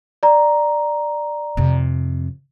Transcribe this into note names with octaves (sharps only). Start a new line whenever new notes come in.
D5 A#5
F2 C3